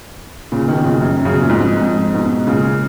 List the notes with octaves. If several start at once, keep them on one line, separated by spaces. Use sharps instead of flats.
A#2 C#3
B2 D#3
A#2 C#3
F#2
F#2
C#3
B2
A#2
F2 G#2
F2 G#2
G#2 B2
A#2 C#3